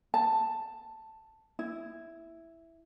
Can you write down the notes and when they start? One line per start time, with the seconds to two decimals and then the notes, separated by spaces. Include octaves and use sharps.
0.14 A5
1.59 E4